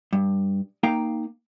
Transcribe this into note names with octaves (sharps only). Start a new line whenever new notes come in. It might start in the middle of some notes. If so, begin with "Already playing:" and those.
G2
A#3 D#4 F5 G5 A#5